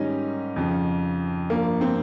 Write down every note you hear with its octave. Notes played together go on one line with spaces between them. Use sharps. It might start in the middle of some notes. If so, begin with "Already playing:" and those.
Already playing: G#2 D#3 G3 C#4 D#4
F2 C#3 F3
G2 F3 A#3
C4